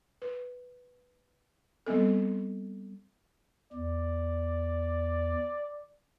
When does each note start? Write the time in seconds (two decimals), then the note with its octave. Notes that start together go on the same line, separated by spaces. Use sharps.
0.22 B4
1.87 G3 B3 C4 A4
3.73 E2 D5